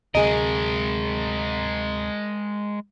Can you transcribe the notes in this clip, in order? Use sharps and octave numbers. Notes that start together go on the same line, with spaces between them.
D2 C3 F#3 G#3 G#4 A#4 D#5